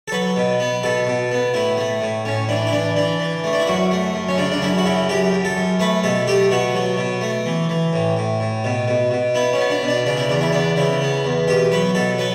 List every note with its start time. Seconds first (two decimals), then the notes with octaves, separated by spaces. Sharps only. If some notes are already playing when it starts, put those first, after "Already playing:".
0.08 A4
0.12 F#3 B4
0.37 B2
0.60 B3
0.83 B2 A4
1.07 B2
1.31 B3
1.54 A2 E4
1.77 A3
2.01 A2
2.25 A2 C#4
2.49 E3 D4
2.67 E4
2.72 E3 D4
2.96 E3 D4
3.19 E3
3.44 A3
3.53 D4
3.60 E4
3.67 F#2 F#4
3.91 A3
4.14 F#2
4.29 C#4
4.38 C#3 D4
4.52 D4
4.62 F#2 E4
4.78 F#4
4.85 C#3 E4
5.09 F#2 G4
5.32 F#2
5.45 A4
5.56 F#2
5.80 A3 B4
6.04 B2 A4
6.27 A3 G4
6.51 B2 F#4
6.74 F#3
6.98 B2
7.21 A3
7.46 E3
7.69 E3
7.93 A2
8.17 A2
8.40 A2
8.64 B2
8.88 B2
9.11 B2
9.34 B3 E4
9.53 C#4
9.58 B3
9.70 D4
9.82 B2
9.88 D4
10.06 C#3 D4
10.17 E4
10.29 E2 D4
10.41 E4
10.52 B3 D4
10.76 C#3 E4
11.01 B3
11.25 E2
11.48 B2 G4
11.72 F#3 B4
11.95 B2 A4
12.19 F#3 B4